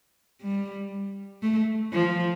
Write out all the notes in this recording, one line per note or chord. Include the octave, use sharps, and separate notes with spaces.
G3
A3
F3